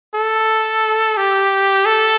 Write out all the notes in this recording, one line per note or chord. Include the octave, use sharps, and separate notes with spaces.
A4
G4
A4